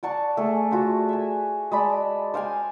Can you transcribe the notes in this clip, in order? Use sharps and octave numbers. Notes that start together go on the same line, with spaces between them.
D5 F#5 A5 C#6
A3 G#4
F4 F#4 C5 E5
E5 G#5
G#3 D5 A5 B5
C5 F5 G5 G#5